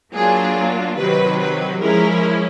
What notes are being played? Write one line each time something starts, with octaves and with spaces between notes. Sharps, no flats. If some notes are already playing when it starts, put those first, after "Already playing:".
F#3 A#3 D4 F4 G#4
C3 D#3 F#3 B4
B4
F3 G#3 C#4 E4 A#4